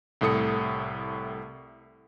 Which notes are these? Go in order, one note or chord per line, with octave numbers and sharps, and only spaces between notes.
C2 A2 A4 D#6 C#7